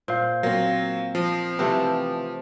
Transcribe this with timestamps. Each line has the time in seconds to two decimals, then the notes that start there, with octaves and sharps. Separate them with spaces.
0.08 A#2 C5 F5
0.43 F#3 A#3 C4 F5
1.15 F3 D#5 C7
1.59 C3 E3 A3 C4 B4 A5